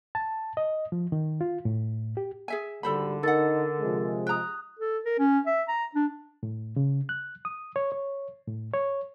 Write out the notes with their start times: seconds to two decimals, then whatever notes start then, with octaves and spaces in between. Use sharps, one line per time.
0.15 A5
0.57 D#5
0.92 F3
1.12 D#3
1.41 F4
1.65 A2
2.17 G4
2.48 G#4 E5 G#5
2.83 G#1 D3 G3 A4 C5 B5
3.23 D#4 A4 A#4 F#5 E6 A6
3.80 C3 F3 G#3
4.27 G5 A#5 D#6 F#6
4.79 A4
5.05 A#4
5.19 C#4
5.46 E5
5.68 A#5
5.95 D4
6.43 A2
6.76 C#3
7.09 F#6
7.45 D#6
7.76 C#5
7.92 C#5
8.47 A2
8.74 C#5